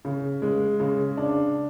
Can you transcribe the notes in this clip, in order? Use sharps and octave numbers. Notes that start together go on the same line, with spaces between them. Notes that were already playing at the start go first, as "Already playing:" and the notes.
C#3
G#3
C#3
D4